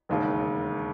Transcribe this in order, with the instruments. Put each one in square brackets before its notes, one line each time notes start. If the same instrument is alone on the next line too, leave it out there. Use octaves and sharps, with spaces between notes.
[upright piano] E1 D#2 C#3